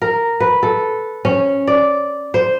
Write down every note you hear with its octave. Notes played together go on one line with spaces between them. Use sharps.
A#4
B4
A4
C#4
D5
C5